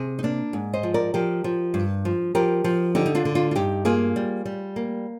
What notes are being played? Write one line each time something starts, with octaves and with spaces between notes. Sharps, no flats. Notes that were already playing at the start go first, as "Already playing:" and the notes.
Already playing: C3 G#4
D#4
A#3 D4
G#2
C5 D#5
F3
A#4 D5
F3 G4 A#4
F3
G2
F3
F3 G4 A#4
F3
D3 D#4 G4
D#4
D4 F4
D3
D4 F4
F4
G2 D#4 G4
A#3 F4 G#4
G3
G3
A#3